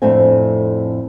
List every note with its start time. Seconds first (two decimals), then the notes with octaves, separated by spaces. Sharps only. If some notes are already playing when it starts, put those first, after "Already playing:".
0.02 F2 A2 A3 C4 D4 G#5